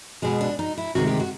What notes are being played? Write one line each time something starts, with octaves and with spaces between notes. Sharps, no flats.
B2 G#3 G#4
D4
D#4
E4
D2 C3 D#3 G#3 F#4
G4
F#4